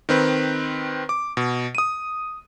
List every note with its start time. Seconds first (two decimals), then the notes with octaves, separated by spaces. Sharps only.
0.09 D#3 C4 B4
1.09 D6
1.37 B2
1.75 D#6 D#7